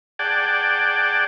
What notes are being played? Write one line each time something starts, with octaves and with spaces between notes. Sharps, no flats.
G#4 D5 F#5 G5 A5